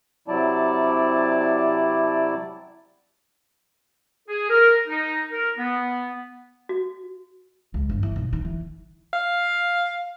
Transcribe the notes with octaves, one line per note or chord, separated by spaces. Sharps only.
C3 F#3 E4 D5 A5
G#4
A#4
D#4
A#4
B3
F#4
C#2
G1
E3
B1
D#3
E3
F5